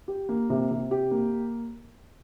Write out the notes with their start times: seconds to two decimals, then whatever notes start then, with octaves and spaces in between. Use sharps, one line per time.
0.08 G4
0.29 A#3
0.50 C3
0.71 C3
0.91 G4
1.11 A#3